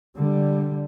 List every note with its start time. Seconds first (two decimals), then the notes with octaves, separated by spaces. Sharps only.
0.16 D3 G3